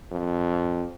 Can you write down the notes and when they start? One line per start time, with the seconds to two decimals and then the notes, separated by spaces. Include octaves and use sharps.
0.12 F2